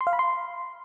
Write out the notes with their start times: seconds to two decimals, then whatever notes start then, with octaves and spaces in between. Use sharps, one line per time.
0.01 C6
0.07 F5
0.13 B5
0.19 C6